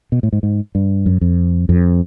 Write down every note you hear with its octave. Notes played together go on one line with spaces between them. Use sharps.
B2
A2
G#2
G#2
G2
F#2
F2
F2